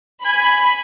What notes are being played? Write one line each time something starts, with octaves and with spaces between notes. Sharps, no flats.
G#5 B5